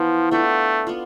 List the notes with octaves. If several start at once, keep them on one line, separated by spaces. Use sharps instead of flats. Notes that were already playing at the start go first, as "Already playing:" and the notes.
Already playing: E3 F3 B3 E4
A3 B3 D4 F4 A4
B3 D4 F4